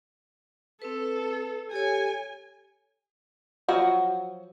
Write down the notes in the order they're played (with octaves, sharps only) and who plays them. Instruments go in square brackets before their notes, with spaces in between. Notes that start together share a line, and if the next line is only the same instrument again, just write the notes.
[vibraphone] C4 B4 [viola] A4
[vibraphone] G4 A4 C#5 [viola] G#5
[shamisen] F3 F#3 F#4